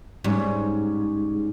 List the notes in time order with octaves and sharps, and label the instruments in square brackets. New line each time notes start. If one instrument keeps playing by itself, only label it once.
[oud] G#2 [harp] G3 C#4